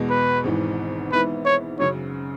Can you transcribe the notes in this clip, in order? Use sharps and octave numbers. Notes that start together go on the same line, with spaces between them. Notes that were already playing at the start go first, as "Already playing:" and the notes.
Already playing: E2 B2 G#3
B4
G#1 G#2 E3
G#2 E3 B3 E4 B4
C#5
F#2 C#3 F#3 C#5